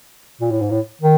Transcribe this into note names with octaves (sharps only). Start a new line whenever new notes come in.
A#2
A2
G#2
A2
D#3